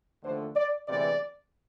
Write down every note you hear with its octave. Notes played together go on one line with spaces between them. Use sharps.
D#2 D3 F3 A3 C5
D5
D2 C3 E3 G#3 B3 D5